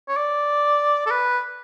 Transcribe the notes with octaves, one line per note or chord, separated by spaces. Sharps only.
C#5
D5
A4
B4